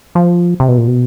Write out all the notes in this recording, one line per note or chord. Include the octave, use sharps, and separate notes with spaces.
F3
C3
B2
A#2
B2